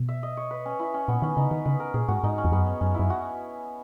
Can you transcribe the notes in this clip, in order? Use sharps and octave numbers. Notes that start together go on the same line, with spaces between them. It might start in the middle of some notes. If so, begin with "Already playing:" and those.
Already playing: B2
E5
D#5
C#5
B4
C#4
E4
C#4
A#2 B3
D#3 C#4
C#3 D#4
D#3 B4
C#3 B4
A#4
A#2 G#4
G#2 F#4
G#2 D#4
C#4
E2
F#2 B3
C#4
F#2 C#4
F#2 E4
F#4